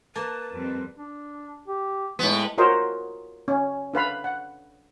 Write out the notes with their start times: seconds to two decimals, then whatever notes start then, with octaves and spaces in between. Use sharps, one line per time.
0.16 A#3 B4 A5
0.52 F2 G3 C4
0.98 D4
1.68 G4
2.19 A2 G#3 B3
2.58 F4 F#4 A#4 C5 C#5 D#5
3.48 C#4
3.94 D4 B4 F5 B5
4.24 F#5